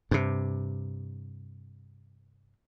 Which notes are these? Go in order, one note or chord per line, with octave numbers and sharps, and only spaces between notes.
G2 C3